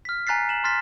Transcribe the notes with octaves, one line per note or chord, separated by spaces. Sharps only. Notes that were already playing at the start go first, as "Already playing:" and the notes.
F6 B6
G#5 A#5 F#6 A6 B6 C7
E7 F#7
C6 F6 A6 B6